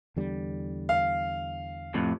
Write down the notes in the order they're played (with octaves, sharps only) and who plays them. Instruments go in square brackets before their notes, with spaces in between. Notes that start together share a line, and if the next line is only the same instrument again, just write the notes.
[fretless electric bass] E2 D3 G3
[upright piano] F5
[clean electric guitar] F2 A2 C3